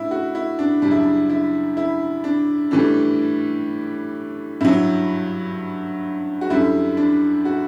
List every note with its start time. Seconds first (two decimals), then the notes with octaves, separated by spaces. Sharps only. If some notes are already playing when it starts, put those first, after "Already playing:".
Already playing: A2 D4 E4
0.11 F#4
0.35 E4
0.59 D4
0.82 F#2 C#3 G3 D4
0.91 E4
1.00 D4
1.30 E4
1.77 E4
2.24 D4
2.71 A2 E3 G3 D4
4.61 G2 F#3 E4
6.41 F#4
6.50 F#2 D3 G3 E4
6.97 D4
7.45 F#4